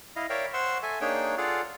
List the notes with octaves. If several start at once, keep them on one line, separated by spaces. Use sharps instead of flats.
E4 D#5 F5
A#4 C#5 D5 E5 F5 G5
C5 F#5 C6 C#6 E6
A4 E5 G#5
A#3 D4 D#4 G#4 C#5 G5
F4 G#4 A4 D5 F5 F#5